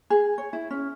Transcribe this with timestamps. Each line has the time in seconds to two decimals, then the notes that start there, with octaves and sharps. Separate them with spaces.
0.10 G#4
0.38 C#5
0.53 E4
0.71 C#4